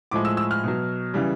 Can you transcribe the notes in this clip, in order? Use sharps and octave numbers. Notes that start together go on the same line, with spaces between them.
A2 F3 G#3 D6
E6
E6
F6
B2 F#3
C#3 E3 G3